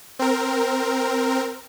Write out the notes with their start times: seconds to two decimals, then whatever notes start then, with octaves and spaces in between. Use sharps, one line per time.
0.19 C4 A#4